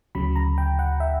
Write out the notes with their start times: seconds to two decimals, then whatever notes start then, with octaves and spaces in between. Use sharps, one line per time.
0.15 D2 C#3 F#3 B5
0.36 A#5
0.58 G5
0.79 F#5
1.00 E5